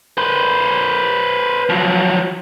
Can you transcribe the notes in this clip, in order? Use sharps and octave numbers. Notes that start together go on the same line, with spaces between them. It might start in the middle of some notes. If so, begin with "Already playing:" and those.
B4 C5
F3 F#3